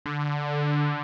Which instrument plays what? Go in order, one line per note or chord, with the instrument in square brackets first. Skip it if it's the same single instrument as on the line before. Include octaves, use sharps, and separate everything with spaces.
[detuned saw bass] D3